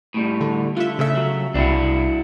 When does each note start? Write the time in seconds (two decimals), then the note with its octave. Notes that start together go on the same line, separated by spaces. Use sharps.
0.14 A2 G3
0.41 D3
0.77 D3 F4 E5
0.99 C#3 A3 E5
1.16 F#3
1.54 C2 D4 E4 F#4